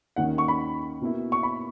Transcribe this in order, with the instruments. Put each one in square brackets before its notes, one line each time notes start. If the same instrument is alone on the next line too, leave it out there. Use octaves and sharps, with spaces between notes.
[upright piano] D#2 D#3 A#3 C#4 [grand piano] F#5
[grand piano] C#6
B5
[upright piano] B2 A#3 E4
[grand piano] C#6
B5